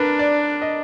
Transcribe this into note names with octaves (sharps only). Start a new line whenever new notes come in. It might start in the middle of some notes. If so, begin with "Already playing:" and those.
Already playing: D4 A#4 B4
D5
D#5